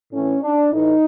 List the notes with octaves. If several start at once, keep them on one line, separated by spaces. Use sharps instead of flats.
A2 E3 C#4
D4
A2 E3 D#4